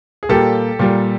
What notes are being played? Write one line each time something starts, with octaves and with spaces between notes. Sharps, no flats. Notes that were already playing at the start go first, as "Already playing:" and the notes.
G#4
A#2 G3 A#3 G4 A4
A#2 G3 A#3